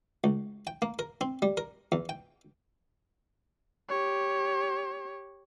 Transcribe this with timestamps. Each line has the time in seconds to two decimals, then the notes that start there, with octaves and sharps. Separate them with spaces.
0.24 C#2
0.67 G5
0.82 A#3
0.99 A#4
1.21 C4
1.42 G3
1.57 A#4
1.92 E2
2.09 G5
3.89 G4 C#5